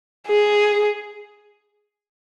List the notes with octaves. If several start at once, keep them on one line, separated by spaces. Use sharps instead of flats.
G#4